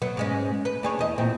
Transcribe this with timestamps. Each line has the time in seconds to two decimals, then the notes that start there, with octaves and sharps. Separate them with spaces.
0.02 F#3 B3
0.17 G#2 G#3 C#4
0.65 B4
0.83 D4 G#4 C#5
0.99 E2 D#5
1.18 E2 A#2 C4